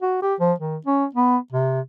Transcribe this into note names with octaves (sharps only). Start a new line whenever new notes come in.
F#4
G4
F3
D#3
C#4
B3
C3